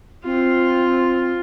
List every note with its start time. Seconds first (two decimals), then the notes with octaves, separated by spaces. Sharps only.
0.25 C4 F4